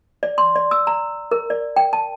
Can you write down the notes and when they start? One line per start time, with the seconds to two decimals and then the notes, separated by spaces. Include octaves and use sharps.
0.23 D5
0.38 C6
0.56 D5
0.71 E6
0.87 A#5
1.31 A#4
1.50 D5
1.76 G5
1.93 A5